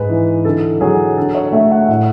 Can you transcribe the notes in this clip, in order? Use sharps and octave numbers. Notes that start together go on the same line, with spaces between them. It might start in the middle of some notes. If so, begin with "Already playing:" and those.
Already playing: G#2 G#3 B4
E3
D3 A4
F#3 G#4
D3 A4
C#5
A3 E5
F#5
A2 F#5